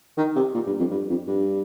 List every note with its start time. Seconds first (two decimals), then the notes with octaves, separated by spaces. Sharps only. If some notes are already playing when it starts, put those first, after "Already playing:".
0.18 D#3
0.35 C3
0.54 A#2
0.66 G2
0.79 F2
0.91 G2
1.10 F2
1.27 G2